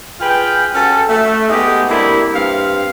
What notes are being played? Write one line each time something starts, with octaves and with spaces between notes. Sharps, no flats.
F4 G#4 B4 G5
C#4 F#4 A4
A3
G#3 B3 D#4 G4
C3 G3 A#3 D4 E4
G2 C4 F5